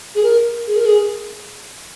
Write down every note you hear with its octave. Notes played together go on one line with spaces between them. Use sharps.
G#4
A#4
G#4
A#4
G#4